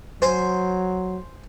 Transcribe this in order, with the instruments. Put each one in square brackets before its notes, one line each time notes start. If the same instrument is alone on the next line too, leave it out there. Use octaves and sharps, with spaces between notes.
[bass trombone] F#3 [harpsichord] C5 G#5 C6